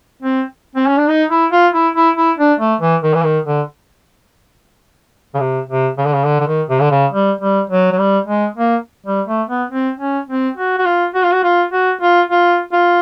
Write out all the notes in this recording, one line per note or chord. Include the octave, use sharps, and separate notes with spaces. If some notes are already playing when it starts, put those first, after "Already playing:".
C4
C4
C#4
D4
D#4
E4
F4
E4
E4
E4
D4
A3
E3
D#3
E3
D#3
D3
C#3
C3
C3
C#3
D3
C#3
D3
D3
D#3
C3
D3
C#3
G3
G3
F#3
F#3
G3
G#3
A#3
G3
A3
B3
C4
C#4
C4
F#4
F#4
F4
F#4
F4
F#4
F4
F#4
F4
F4
F4